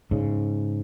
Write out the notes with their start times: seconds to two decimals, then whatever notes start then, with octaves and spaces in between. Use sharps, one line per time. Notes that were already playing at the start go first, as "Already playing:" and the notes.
0.11 G#2 C#3